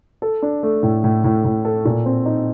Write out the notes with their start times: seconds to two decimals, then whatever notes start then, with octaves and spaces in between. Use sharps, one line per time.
0.22 A4
0.42 D4
0.63 A3
0.83 A2
1.04 A2
1.24 A2
1.44 A2
1.65 A4
1.85 A#2
2.06 C4
2.26 D#4